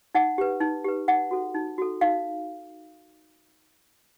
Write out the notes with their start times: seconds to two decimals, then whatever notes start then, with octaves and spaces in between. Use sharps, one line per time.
0.15 D#4 F#5
0.38 G4 B4
0.61 D#4
0.84 G4 B4
1.08 D#4 F#5
1.31 F#4 A4
1.54 D#4
1.78 F#4 A4
2.01 D#4 F5